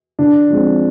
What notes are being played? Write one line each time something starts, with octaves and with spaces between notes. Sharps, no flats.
D3 D4
F3 G#3 C4